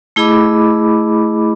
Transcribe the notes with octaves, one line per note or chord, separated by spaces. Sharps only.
A3 E4 G#4 D#5 B5 D6